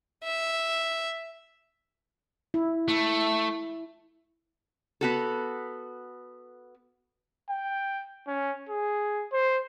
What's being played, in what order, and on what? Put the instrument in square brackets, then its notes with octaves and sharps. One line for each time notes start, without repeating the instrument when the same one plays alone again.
[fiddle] E5
[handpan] E4
[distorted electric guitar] A3 [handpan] E4
[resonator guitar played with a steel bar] B3 F#4 A4
[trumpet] G5
C#4
G#4
C5